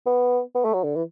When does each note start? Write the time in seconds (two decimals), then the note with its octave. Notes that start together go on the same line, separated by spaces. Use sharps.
0.06 B3
0.55 B3
0.65 A3
0.74 F#3
0.84 D3
0.96 E3